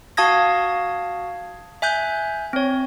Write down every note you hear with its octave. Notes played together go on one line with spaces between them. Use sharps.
F#4 F5 A5 D#6 G#6 A#6
E5 G#5 F#6 G6
C4 C#5